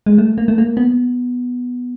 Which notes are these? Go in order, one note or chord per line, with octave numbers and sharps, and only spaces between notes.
G#3
A3
A#3
A3
A#3
B3